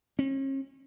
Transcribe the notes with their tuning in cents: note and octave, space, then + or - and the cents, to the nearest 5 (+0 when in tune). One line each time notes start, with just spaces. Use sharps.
C#4 -40